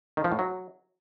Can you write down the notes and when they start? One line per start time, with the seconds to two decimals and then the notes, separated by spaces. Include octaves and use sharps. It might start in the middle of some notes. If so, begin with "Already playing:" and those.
0.17 D#3
0.24 F3
0.32 A2
0.39 F#3